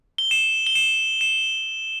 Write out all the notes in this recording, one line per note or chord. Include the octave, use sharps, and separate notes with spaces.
G7
E7
G7
E7
E7